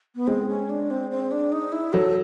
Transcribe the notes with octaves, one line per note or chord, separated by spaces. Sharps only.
B3
G#3 C4
C#4
D4
C4
C4
D4
D#4
E4
F#3 A4